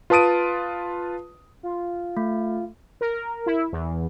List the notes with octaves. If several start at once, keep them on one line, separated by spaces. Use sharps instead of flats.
F4 B4 A5 D#6 D7 D#7
F4
A3
A#4
E4
E2